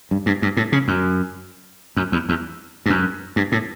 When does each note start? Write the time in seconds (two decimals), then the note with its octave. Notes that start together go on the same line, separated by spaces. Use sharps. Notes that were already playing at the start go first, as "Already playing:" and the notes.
0.11 G2
0.26 G2
0.42 G2
0.57 A2
0.72 C#3
0.88 F#2
1.97 F#2
2.12 E2
2.29 E2
2.86 G2
2.90 F#2
3.36 G2
3.52 A2